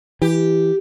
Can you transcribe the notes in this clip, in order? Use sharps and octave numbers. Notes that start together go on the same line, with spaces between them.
E3 G4